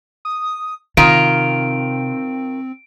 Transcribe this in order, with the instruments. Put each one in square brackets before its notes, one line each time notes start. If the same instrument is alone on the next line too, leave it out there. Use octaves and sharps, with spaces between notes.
[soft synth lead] D#6
[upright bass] C3 [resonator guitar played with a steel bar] D#3 F4 [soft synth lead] C4 [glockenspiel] D7